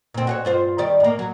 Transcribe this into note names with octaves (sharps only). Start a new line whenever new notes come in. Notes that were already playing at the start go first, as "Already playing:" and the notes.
A#2 C4
F#4 G#4 C#5
G2 F4 C5
D#3 G3 D5
A2 A#3
F#3